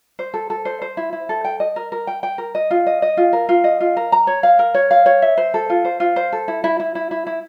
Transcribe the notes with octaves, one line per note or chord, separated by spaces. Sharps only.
C5
A4
A4
C5
C5
E4
E4
A4
G5
D#5
A#4
A#4
G5
G5
A#4
D#5
F4
D#5
D#5
F4
A#4
F4
D#5
F4
A#4
A#5
C#5
F5
A#4
C#5
F5
C#5
E5
C5
A4
F4
C5
F4
C5
A4
E4
E4
E4
E4
E4
E4